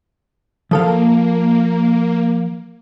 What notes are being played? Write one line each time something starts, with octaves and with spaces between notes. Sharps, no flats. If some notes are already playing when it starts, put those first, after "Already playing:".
F3 A#3 A4 F5